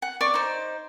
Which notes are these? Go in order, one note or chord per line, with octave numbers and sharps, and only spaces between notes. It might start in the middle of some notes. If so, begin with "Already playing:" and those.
F#5
D5 C#6
D#4 C5